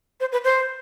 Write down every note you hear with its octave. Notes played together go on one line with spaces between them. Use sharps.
C5
B4
C5